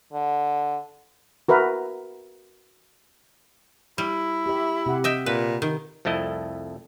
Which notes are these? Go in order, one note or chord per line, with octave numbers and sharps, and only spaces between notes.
D3
F#4 A#4 B4 E5
G3 E4
G4 E5
C3 G4 F#5
D#5 E5 G5
A#2 B4
D#3
C2 F2 A3 E4 D#5